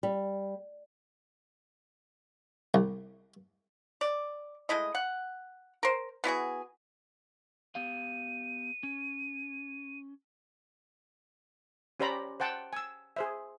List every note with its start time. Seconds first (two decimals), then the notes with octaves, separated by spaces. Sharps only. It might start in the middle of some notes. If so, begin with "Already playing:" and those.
0.03 G3
2.74 C2
4.01 D5
4.69 G#3 A3 E4 D#5
4.95 F#5
5.83 A#4 C5
6.24 B3 E4 F#4 G#4
7.75 B3 G4 F5 D#7
8.83 C#4
12.00 C#4 G4 C5 D5 A#5 B5
12.40 C5 F#5 G5 A5
12.73 G#5 E6
13.16 G#4 C5 E5